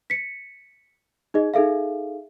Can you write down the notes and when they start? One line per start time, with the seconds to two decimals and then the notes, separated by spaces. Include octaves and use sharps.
0.10 B6 C#7
1.34 D#4 G#4 D#5
1.54 D#4 G#4 A4 E5 F5